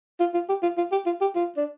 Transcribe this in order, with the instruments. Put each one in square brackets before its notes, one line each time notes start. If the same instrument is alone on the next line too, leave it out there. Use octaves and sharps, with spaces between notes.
[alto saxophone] F4
F4
G4
F4
F4
G4
F4
G4
F4
D4